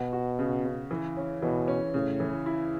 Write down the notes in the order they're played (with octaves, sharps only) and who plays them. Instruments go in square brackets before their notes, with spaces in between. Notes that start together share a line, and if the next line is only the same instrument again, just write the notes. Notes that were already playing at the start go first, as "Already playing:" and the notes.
Already playing: [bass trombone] B2 [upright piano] F#4
[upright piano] F#4
C#3
C#3
E3
C#4
[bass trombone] B2 [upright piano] E3
[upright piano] C#4
[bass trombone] A2 [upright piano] C#3
[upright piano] E3
E4